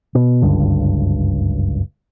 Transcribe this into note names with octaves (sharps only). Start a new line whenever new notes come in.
B2
F#1 C#2 G2 D3